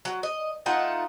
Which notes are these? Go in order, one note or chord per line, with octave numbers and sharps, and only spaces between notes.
F#3
D#5
A3 D#4 F4 F#5